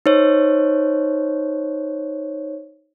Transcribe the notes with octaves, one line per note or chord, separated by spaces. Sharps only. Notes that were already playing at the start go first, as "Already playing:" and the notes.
D#4 C5 C#5